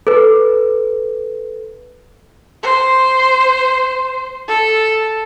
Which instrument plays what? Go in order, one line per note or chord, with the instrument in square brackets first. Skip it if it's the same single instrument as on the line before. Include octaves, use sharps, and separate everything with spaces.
[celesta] A4 B4
[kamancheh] C5
A4